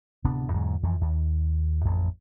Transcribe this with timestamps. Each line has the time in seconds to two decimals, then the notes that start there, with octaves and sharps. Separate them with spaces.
0.24 D1 C3 B3 D4
0.53 E2 G#2 D3 F#3
0.83 F2 E3 F3
1.01 D#2
1.85 A1 F2